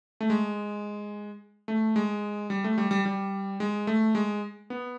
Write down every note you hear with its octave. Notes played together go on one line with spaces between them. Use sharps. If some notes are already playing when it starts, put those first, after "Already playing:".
A3
G#3
A3
G#3
G3
A3
G3
G3
G3
G#3
A3
G#3
B3